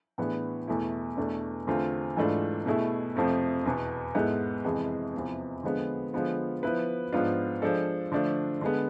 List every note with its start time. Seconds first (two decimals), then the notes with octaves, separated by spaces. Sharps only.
0.18 A2 E3 B3 D4 G#4
0.68 E2 B2 A3 E4
1.17 E2 B2 A3 D4
1.67 E2 D3 A3 C4 F4
2.17 G#2 E3 A3 D4 F4
2.66 B2 A3 E4 G#4
3.16 F2 C3 F3 A3
3.65 E2 B2 B3
4.15 G#2 G#3 B3 E4 A4
4.64 F2 C3 E3 G#3
5.14 E2 C3 F3 B3
5.63 D3 F3 G#3 B3
6.13 D3 F3 G#3 B3 F4
6.63 F3 B3 E4 B4
7.13 G#2 F3 B3 D4 F4
7.62 F3 G#3 D4 A4
8.12 D3 F3 A3 D4
8.61 D3 G#3 B3